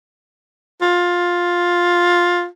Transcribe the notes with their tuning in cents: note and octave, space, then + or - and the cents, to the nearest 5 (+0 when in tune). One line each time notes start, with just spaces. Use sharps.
F4 +10